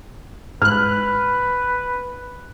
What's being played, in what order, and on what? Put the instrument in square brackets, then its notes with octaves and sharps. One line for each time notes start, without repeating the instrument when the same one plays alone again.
[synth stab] G#2 F#6 [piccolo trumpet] B4 [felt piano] F6